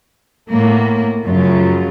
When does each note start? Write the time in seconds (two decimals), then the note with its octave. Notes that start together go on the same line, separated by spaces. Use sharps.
0.52 A2 A#3 B3
1.24 F#2 C#3 F3 F#3 F4